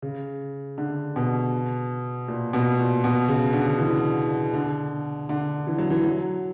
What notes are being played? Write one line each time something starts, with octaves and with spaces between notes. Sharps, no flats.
C#3
D3
B2
A#2
B2
A#2
B2
C#3
D3
E3
D3
D3
E3
F#3
E3
F#3